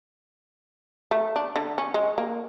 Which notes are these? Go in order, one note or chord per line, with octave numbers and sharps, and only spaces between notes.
A3
D4
D3
C#4
G#3
A#3